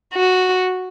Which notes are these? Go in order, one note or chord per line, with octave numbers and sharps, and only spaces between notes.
F#4